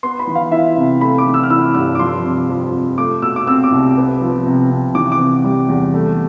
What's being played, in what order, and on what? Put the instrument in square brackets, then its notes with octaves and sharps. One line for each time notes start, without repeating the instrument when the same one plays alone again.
[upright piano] B3 C6
B5
E3
F5
E4 E5
C3
A3 B5
D6
E3
E6
F6
E4 E6
G2 E6
D6
F3 C6
C3
F2
F2
A3 D6
B2 E6
D6
C4 E6
D6
C2
B3
F3
C3
C3
E3 D6
D6
C3
G3
E2
A3